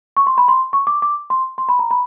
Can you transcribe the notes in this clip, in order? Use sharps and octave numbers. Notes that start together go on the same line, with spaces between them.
C#6
C6
B5
C6
C#6
D6
D6
C6
C6
B5
A#5
B5